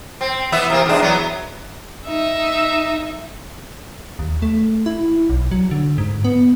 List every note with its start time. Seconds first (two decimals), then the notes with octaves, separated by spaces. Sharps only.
0.21 C4
0.52 E3 B3 E5
0.70 C3 A#3
0.86 E2 G#3 D4
1.01 F#3 B3
2.07 D#4 E5
4.19 D#2
4.42 A3
4.86 E4
5.30 B1
5.51 F#3
5.71 D3
5.98 G#2
6.24 B3